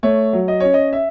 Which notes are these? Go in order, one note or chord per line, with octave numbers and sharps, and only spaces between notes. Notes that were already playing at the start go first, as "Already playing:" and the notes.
A3 C#5
F#3
D#5
C#4 C#5
D#5
E5